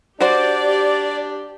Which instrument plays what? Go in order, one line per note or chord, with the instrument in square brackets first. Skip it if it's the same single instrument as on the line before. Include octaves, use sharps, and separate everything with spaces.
[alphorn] D4 [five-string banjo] F#4 C5 [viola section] G4 [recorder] D5